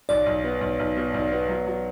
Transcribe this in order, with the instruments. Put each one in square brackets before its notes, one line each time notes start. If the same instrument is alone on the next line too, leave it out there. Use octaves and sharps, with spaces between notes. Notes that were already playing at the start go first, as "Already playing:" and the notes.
[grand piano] B1 [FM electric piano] D5
[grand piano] B1
B3
B1
B1
B2
B1
B3
F#3
F#3